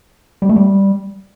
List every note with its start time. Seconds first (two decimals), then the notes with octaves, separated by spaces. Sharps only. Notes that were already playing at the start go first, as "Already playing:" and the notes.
0.42 G3
0.49 A3
0.56 G3